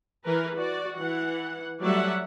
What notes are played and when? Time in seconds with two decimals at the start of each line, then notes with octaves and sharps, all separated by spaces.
0.25 E3 A#4 B4
0.56 F#4 D5
0.97 E3 F#5
1.81 F#3 G3 A3 D5 E5 F#5